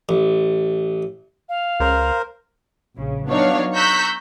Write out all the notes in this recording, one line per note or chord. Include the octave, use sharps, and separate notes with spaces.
A1
F5
C#2 A#4 C5
A#1 C#3
F#3 B3 D4 D#4 C#5 F5
A#5 C#6 E6 F#6 G6 B6